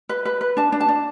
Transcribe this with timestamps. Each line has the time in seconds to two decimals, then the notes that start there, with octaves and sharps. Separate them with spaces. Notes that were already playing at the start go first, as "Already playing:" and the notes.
0.09 B4
0.25 B4
0.41 B4
0.57 D4 A5
0.72 D4
0.81 A5
0.89 D4